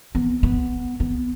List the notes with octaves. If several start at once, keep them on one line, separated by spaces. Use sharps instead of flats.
B3
B3
B3